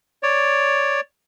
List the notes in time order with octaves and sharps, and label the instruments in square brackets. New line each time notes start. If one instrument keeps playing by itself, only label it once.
[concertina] C#5 D5